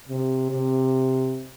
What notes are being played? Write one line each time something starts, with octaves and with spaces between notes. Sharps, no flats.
C3
C3